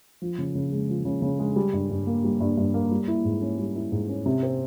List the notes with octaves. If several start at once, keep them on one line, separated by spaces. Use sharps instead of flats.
F3
C#3
C#3
G#3
F3
C#3
C#3
G#3
G3
G2
G2
A#3
G3
G2
G2
A#3
G3
E4
G#2
C#4
G3
E4
G#2
C#4
C3
C4